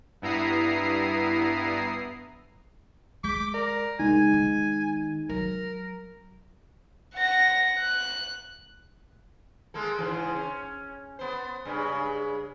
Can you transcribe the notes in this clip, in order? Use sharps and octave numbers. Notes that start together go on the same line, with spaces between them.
G2 B3 E4 A#5 D#6 C7
G#3 D6 G6 B6
A#4 D5
C#3 G#3 D#4 G#5
D#3
F#3 A#4
F#5 A#6
F#6
G#3 A#3 A4
G#2 C#3 E3
C#4
B3 C5
G2 C#3 G#3